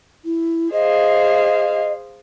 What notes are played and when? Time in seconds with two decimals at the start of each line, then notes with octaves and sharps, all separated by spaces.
0.25 E4
0.72 G#4 C5 D#5 F5